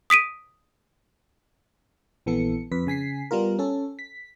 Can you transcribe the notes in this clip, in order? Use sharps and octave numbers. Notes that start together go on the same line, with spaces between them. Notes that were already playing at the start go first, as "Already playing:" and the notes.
D#6 B6 D7 D#7
A#1 E3 B3 A4 C#7
F2 B4 B6
C#3 G#5 B6 C7
G3 B3 F4 A#4
C#4 A4
B6